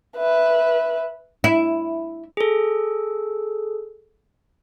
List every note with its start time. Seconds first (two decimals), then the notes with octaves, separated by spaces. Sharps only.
0.17 B4 E5
1.44 E4
2.37 G#4 A4